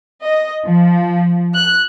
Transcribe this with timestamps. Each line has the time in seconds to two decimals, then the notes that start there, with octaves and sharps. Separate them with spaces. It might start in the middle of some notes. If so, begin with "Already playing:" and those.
0.24 D#5
0.65 F3
1.55 F#6